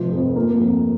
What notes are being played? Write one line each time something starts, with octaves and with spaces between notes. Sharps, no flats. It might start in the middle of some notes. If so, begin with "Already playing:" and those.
Already playing: F1 F3
F2
A#3
F2